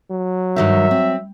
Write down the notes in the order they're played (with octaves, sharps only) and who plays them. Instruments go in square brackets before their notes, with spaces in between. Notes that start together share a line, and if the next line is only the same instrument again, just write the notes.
[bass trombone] F#3
[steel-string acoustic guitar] G2 D#3 D#4 [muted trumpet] E5
[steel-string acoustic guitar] C4